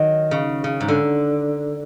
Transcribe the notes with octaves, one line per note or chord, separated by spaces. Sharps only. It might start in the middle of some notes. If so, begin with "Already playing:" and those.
Already playing: D#3 F#3
C#3
C#3
G#2
D3